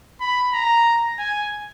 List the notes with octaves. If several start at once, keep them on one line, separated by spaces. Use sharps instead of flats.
B5
A#5
G#5